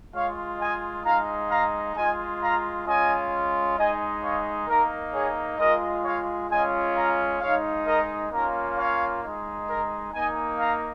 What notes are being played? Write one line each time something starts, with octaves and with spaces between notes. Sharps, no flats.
G#3 F4 C#5 F5
D#5 G#5
G#3 D#4 F5 A#5
F5 A#5
G#3 F4 D#5 G#5
F5 A#5
G#3 C#4 F4 D#5 G#5
G#3 D#4 D#5 G#5
C#5 F5
A#3 D#4 A#4
G#4 C#5
G#3 F4 A#4 D#5
C#5 F5
G#3 C#4 F4 D#5 G#5
F5 A#5
G#3 D#4 C#5 F5
A#4 D#5
A#3 C#4 F4 A#4
C#5 F5
G#3 D#4
A#4
A#3 D#4 D#5 G#5
F5 A#5